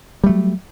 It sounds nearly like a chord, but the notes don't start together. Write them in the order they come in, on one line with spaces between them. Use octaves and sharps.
G3 A3 F#3